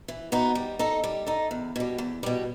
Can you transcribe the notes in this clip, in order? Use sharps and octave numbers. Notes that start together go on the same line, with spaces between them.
E3
B3 D#4 F#4
G3
D#4 A4 D#5
G3
D#4 A4 D#5
E2
B2 G3
E2
B2 G3